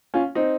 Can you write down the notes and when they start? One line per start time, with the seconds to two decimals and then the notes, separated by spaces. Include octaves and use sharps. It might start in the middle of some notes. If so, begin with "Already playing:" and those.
0.14 C#4 F4
0.35 C4 D#4